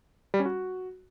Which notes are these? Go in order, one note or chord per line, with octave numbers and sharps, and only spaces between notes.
G3
C#4
F#4